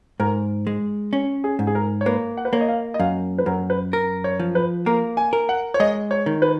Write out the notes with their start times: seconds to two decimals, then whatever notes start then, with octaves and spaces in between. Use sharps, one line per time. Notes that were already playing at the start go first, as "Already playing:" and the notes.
0.20 G#2 A#4
0.67 G#3
1.13 C#4
1.44 G#4
1.59 G#2
1.67 G#4
1.75 A#4
2.01 C#5
2.06 A#3 B4
2.37 F#5
2.45 B4
2.53 A#3 C#5
2.61 D#5
2.68 F5
2.94 D#5
3.00 F#2 F5
3.38 B4
3.46 F#2 A#4
3.70 B4
3.93 A#4
4.24 C#5
4.40 F3
4.55 B4
4.86 A#3 A#4
5.17 G#5
5.33 A#4
5.49 F#5
5.74 C#5
5.80 G#3 D#5
6.11 C#5
6.26 D#3
6.42 B4